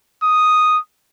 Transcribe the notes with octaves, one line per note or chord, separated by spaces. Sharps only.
D#6